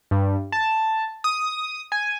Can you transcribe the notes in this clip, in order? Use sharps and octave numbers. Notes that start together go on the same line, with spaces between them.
G2
A5
D#6
G#5